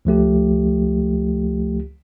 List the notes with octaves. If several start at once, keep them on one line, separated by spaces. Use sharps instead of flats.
C#2 F3 A3 G4